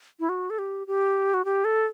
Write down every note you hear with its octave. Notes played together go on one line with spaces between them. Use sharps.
E4
F#4
A4
G4
G4
F#4
G4
A4